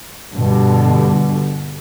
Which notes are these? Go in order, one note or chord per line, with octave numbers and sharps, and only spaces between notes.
G2 B2 D3